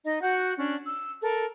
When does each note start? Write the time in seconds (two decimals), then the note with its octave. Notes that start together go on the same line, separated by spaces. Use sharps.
0.04 D#4 D#5
0.22 F#4 F#5 G6
0.58 C#4 D4
0.86 E6
1.22 A4 A#4